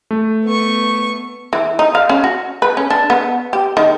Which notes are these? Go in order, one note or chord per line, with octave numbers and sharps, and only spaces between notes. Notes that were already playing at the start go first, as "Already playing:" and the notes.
A3
B3 C#6
E3
D#4
F5
C#4
F#4
B4
C#4
D4
B3
G4
D#3